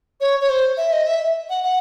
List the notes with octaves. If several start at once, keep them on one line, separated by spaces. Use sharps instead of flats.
C#5
C#5
C5
E5
D#5
E5
F#5
F#5